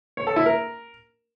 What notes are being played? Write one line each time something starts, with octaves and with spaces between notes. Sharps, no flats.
C#5
A4
E4
A#4